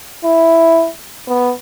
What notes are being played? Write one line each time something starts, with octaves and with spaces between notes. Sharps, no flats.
E4
B3